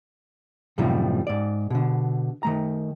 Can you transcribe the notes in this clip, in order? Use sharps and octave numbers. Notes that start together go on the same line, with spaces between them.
F#2 A2 C3 D#3 F3 G3
G#2 D5
B2 D3
D#3 A3 A#5